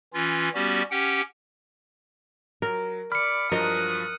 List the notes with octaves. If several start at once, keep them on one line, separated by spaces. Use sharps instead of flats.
E3 C#4 F4
G3 B3 C#4 F#4 G4
C#4 G4 F#5 G5
F#3 A#4
D5 B5 F6 C#7
G2 F3 F#3 A#4 D#5 D#6 F#6